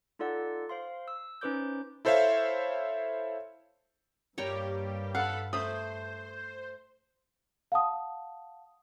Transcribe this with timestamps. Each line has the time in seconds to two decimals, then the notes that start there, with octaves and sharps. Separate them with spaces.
0.19 D#4 F4 A4 D5 F#5
0.69 C5 F5 C6
1.08 E6
1.41 C#4 D#4 B4 C5 D6 G6
2.05 E4 A4 C5 C#5 E5 F5
4.38 G2 G3 A#3 G4 C#5 G5 A#5
5.15 A4 F5 F#5 B5
5.53 A3 C5 B5 D#6
7.72 F5 F#5 A5 D#6